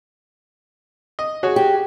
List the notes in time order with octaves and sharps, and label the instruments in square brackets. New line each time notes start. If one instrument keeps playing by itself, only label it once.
[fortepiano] D#5
F#4 G#4 C#5
[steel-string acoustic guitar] G4